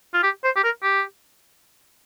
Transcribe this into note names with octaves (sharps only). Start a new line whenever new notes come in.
F4
G4
C5
G4
A#4
G4